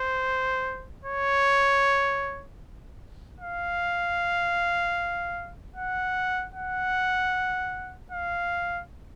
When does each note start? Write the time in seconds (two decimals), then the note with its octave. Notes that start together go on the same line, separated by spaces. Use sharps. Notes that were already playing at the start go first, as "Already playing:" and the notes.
Already playing: C5
1.04 C#5
3.40 F5
5.76 F#5
6.54 F#5
8.12 F5